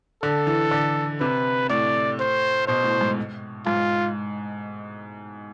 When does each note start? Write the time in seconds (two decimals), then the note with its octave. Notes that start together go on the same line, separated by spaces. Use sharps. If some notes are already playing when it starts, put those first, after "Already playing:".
0.22 D3 A4
0.47 E3
0.71 D3
1.20 C3 B4
1.70 A2 D5
2.19 C5
2.68 B2 C5
2.84 A2
3.01 G#2
3.66 G#2 F4